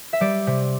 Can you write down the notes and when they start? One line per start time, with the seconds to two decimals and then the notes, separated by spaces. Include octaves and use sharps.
0.13 E5
0.21 G3 D5
0.47 C3